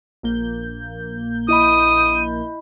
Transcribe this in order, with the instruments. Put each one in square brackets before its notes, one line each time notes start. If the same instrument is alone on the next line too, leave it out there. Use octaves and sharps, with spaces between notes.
[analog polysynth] A#1 A#3 G6
[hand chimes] E4 D#5 B5 [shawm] D#6 [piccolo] D#7